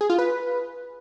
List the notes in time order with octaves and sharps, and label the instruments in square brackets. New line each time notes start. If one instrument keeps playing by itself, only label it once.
[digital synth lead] G#4
F4
B4